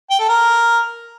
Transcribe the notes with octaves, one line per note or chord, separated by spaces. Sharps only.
G5
A4
A#4